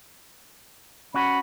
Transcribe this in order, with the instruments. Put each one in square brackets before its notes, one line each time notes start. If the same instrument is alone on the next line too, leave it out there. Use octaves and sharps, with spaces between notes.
[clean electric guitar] C#4 F#4 [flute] B5